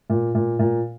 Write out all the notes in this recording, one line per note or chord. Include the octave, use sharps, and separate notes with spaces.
A#2
A#2
A#2